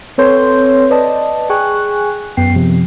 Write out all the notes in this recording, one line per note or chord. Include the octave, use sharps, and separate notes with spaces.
C4 A4 B4 C#5 C6 G6
B4 D5 D#5 A5
G#4 G5 G#5 C#6 F#6
F#2 B3 G5 C7
C3 F3